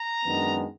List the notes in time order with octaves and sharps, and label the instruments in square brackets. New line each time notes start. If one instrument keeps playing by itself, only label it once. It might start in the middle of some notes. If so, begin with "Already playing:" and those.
Already playing: [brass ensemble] A#5
F#2 D#3 G#3 B3 D4